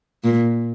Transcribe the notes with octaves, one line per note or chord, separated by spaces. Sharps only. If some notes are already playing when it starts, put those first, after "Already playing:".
A#2